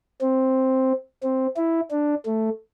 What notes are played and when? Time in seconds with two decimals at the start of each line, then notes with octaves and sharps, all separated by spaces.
0.21 C4
1.23 C4
1.57 E4
1.91 D4
2.26 A3